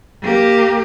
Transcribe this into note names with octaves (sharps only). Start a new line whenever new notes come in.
A#3 G4